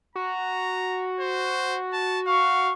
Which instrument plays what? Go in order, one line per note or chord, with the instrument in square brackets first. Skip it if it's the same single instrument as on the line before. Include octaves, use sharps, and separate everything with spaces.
[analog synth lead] F#4 [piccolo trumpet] A#5
[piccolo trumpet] C5
A5
[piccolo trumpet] F5 [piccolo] C#6